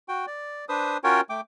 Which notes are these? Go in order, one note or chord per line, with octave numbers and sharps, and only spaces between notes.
F#4 G5
D5
D4 B4 C5 D#6
C#4 F4 F#4 A#4 C#5 G5
A3 G5 D6